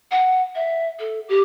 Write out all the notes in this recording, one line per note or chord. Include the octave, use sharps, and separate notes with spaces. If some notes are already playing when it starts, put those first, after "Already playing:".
F#5
E5
A4
G4